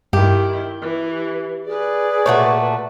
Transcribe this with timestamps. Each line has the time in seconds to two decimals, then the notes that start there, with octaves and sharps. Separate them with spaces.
0.13 G2 D#3 E4 G4
0.81 E3
1.65 G#4 B4 D5
2.26 A#2 A3 F#4 C#5